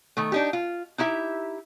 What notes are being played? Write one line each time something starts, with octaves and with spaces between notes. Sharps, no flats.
D#3 A3
D4 D#4 G4
F4
D#4 E4 G4 E5